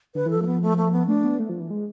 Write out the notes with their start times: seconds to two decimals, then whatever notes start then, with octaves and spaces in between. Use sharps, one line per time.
0.15 D3 B4
0.26 E3
0.30 A4
0.35 F3
0.42 A3
0.47 B3
0.62 A3
0.77 A3
0.92 B3
1.07 A3 D4
1.24 B3
1.39 A3
1.49 F3
1.60 E3
1.71 G#3